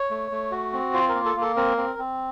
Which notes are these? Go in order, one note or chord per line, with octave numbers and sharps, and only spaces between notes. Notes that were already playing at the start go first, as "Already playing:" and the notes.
Already playing: C#5
A3
A3
F#4
C4
F4 C5
A#4
A#3
A4
A#3
A4
C4 A#4
C4
C4